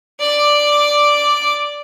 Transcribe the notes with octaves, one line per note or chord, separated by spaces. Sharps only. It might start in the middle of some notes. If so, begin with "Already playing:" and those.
D5 D6